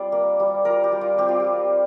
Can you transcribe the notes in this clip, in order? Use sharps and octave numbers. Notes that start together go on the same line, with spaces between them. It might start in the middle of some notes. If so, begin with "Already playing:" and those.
Already playing: G3 C4 F4 C5 D5
A#3
G3
F4 A#4
G4
G3
F4
C4 G4
F4
G3 G4